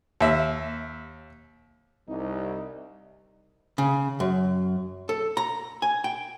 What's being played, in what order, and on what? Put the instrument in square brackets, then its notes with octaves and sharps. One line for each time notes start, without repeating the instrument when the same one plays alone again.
[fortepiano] D#2 E5
[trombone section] C2 G3 [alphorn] D#4
[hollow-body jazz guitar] C#3
F#2
A4
A#5
G#5
G5